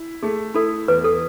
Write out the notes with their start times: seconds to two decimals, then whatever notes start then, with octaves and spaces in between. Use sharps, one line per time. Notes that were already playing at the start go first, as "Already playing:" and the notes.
Already playing: E4
0.23 A3 G#4
0.54 E4 A4
0.88 E2 B4
1.04 A4